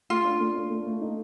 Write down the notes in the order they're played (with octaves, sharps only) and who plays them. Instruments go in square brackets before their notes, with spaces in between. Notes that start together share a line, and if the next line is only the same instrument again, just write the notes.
[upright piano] A3 [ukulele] F4
[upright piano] D4
A3
D4
A3
A3
D#4